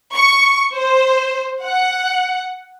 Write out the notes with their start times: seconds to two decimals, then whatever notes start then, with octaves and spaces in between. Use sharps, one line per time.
0.13 C#6
0.75 C5
1.63 F#5